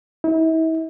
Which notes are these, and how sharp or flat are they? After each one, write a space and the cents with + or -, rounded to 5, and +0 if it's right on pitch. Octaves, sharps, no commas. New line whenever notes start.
E4 -40